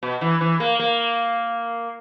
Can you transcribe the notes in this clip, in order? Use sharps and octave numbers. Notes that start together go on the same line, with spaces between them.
B2
E3
E3
A#3
A#3